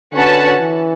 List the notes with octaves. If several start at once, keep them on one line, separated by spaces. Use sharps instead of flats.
D3 C#4 F#4 B4 F#5 A5
E3